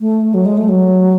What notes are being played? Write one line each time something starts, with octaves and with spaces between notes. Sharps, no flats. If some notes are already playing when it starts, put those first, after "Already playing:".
A3
F#3
G#3
A3
F#3